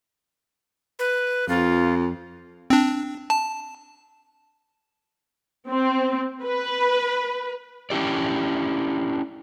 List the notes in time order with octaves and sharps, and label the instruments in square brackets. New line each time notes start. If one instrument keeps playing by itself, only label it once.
[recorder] B4
[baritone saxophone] F2 [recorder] F4
[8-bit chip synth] C4 D4
A5
[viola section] C4
B4
[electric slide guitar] C#4 D4 E4 G4 D5